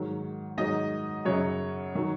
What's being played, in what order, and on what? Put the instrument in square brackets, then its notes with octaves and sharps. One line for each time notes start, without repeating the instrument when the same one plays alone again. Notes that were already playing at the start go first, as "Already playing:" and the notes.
Already playing: [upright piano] G#2 D#3 F#3
G#2 D#3 F#3 D#4 D#5
F#2 C#3 F#3 C#5
D#3 F#3